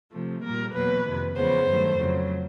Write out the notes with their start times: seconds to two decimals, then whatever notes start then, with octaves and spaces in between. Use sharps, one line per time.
0.11 C3 F3 A3
0.42 A#2 G3 A#3 A#4
0.74 E2 B2 F#3 A#3 B4
1.05 F2 C3 D#3
1.36 E2 C#3 F3 G#3 B3 C5
1.67 G2 D#3 F#3 A3
1.98 F2 C#3 F#3